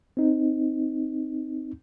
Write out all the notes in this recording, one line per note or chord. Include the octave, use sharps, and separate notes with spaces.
C4 D#4